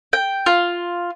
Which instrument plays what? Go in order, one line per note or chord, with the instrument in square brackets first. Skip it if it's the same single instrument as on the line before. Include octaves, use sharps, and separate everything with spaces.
[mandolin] G5
F4